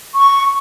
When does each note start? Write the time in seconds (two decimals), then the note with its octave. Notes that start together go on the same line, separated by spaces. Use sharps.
0.15 C#6